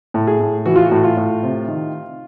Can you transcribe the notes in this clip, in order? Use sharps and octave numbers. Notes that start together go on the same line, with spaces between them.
A2
G#4
A2
E3 F#4
F4
F#4
A2
F4
A2
C3
D#3